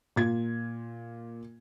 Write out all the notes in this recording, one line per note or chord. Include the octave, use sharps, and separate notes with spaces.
A#2 F4 G#6